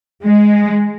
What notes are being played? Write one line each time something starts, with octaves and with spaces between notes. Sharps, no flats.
G#3